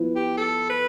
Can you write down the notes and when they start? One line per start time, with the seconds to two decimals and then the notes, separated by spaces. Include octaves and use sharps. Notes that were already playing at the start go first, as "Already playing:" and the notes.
Already playing: F3 B3 E4
0.15 G4
0.37 A4
0.70 B4